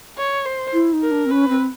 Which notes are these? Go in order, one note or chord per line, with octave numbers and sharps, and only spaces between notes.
C#5
C5
E4
D#4
A#4
D4
C4
C#4 B4
C4